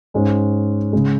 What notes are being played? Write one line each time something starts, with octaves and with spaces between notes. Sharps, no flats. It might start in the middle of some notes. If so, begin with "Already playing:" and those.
G#2 G#3 C#4
C#3 G#3